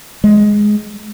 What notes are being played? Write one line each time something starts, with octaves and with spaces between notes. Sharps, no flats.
G#3